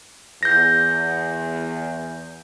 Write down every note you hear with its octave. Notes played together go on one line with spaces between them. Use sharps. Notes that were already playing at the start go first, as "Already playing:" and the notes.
E2 G6 A#6